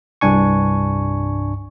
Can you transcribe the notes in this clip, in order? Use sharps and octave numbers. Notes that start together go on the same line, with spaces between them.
C2 G2 D4 G#5 C#6